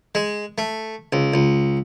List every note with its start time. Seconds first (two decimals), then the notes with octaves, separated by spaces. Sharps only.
0.15 G#3
0.58 A3
1.13 C#2
1.34 C#2